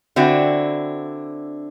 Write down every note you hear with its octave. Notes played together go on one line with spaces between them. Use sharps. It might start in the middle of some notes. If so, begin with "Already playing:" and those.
D3 C4 D4 E4 F#4